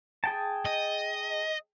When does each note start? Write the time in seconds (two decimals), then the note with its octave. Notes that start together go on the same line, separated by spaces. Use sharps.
0.24 G#4 G5 A5
0.66 D#5